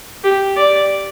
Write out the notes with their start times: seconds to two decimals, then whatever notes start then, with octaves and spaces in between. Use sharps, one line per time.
0.24 G4
0.57 D5